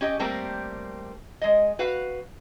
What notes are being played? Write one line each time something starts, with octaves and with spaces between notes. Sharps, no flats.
C#4 G4 D#5
G3 A3 A#3 C4 G4 A#4
G#3 D#5
F#4 B4 F5 F#5